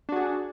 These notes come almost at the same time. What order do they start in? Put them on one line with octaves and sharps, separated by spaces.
D4 F#4 G#4